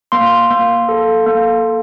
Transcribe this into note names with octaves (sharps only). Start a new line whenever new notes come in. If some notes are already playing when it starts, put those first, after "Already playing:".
A#3 C6
A#3
A4
A#3